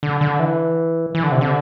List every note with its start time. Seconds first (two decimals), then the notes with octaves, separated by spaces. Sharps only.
0.03 D3
0.21 D3
0.39 E3
1.15 E3
1.23 D3
1.32 C3
1.41 D3